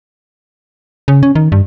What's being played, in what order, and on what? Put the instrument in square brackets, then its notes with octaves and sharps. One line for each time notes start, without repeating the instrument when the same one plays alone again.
[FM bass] C#3
C#4
D#3
G2